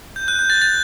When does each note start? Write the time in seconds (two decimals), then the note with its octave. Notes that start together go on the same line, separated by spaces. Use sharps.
0.16 G6
0.28 F#6
0.39 G6
0.50 A6
0.62 A6